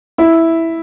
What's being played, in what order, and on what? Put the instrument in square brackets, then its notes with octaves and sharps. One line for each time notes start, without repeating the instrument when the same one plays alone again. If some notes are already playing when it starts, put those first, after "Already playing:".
[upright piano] E4